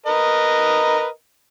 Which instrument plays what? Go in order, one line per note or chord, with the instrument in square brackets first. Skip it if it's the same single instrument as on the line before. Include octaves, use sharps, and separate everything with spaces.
[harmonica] A#4 B4 D#5